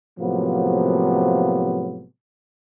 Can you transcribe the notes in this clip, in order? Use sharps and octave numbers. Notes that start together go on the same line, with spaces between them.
A2 C3 F3 F#3 A#3 B3